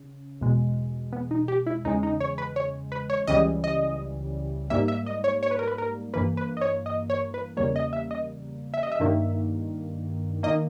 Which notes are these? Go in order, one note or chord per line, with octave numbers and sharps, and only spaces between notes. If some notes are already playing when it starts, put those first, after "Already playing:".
Already playing: C#3
E2 B2 G#3
B3
D#4
G4
E4
E2 C#3 G#3 D#4
D#4
C#5
B4
C#5
B4
C#5
C#2 C#3 E3 G3 D#5
D#5
G#2 G3 A#3 E5
E5
D#5
C#5
C#5
B4
A#4
B4
A#4
G2 E3 A#3 B4
B4
D#5
C#5
D#5
C#5
B4
E2 C#3 G3 A#3 C#5
D#5
E5
D#5
E5
D#5
E5
G2 D#3 A#3
D#3 A#3 D#5